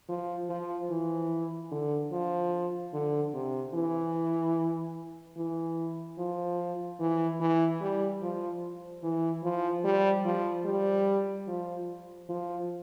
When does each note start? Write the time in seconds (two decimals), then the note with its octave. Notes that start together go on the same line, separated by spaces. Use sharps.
0.09 F3
0.50 F3
0.90 E3
1.72 D3
2.12 F3
2.93 D3
3.34 C3
3.74 E3
5.37 E3
6.18 F3
7.00 E3
7.41 E3
7.81 G3
8.22 F3
9.03 E3
9.44 F3
9.84 G3
10.25 F3
10.65 G3
11.47 F3
12.29 F3